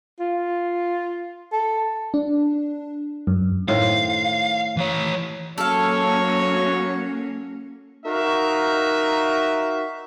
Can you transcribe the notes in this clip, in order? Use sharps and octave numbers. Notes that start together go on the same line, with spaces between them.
F4
A4
D4
F#2
A2 D#3 C5 F5
E3 C#5
F#3 A#3 C#4 A4 C#5 F5
D#4 F#4 A#4 E5 F5